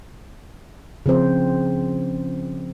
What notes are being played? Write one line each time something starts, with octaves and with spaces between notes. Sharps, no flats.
C#3 F3 C4 C5